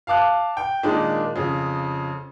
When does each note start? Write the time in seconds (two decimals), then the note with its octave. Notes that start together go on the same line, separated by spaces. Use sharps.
0.07 F5 A5 D6 F#6
0.57 G5
0.83 A#2 D#3 G#3 D4
1.36 F2 C#3